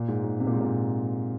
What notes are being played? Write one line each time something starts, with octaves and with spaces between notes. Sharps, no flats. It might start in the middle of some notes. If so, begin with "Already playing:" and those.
Already playing: A#2
G#2
G#2
C3
A#2
G#2
A#2